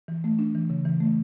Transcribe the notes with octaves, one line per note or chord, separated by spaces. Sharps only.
E3
A3
D4
E3
C#3
E3
A3